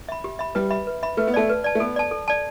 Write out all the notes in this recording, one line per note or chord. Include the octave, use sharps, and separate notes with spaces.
E5 B5
G4
E5 B5
G3 B4
E5 B5
B4
E5 B5
A3 B4
B3
A3 D5 A5
B4
D5 A5
A3
B3 A4
D5 A5
A4
D5 A5